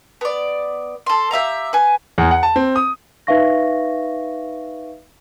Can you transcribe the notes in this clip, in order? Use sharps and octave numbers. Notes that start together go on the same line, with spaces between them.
B3 D5
A4 C6
G4 E5 F5 A#5
B4 G#5
E2
F#5
A5
C4
D#6
D#4 B4 E5 F5 C#6 A#6